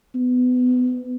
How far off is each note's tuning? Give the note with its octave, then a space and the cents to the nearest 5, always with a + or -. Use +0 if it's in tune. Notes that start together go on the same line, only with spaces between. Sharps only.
B3 +25